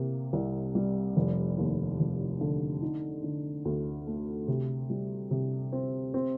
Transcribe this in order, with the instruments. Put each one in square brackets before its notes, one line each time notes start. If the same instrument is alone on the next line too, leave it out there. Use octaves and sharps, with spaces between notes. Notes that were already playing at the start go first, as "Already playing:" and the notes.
Already playing: [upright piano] C3 A#3
C2
G3
F1
D#2
F1
D3
D#4
D3
D2
A3
C3
G3
C3
C4
C4